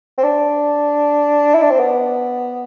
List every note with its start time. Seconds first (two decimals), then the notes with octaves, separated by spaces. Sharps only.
0.18 C4
0.24 D4
1.54 E4
1.62 D4
1.70 C4
1.79 B3